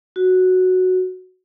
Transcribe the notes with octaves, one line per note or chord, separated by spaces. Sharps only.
F#4